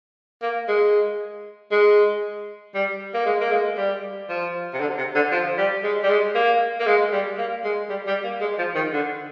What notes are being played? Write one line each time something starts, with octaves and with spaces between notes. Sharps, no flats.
A#3
G#3
G#3
G3
A#3
G#3
A#3
G#3
G3
F3
C3
D3
C3
D3
F3
G3
G#3
G3
G#3
A#3
A#3
G#3
G3
A#3
G#3
G3
G3
A#3
G#3
F3
D#3
D3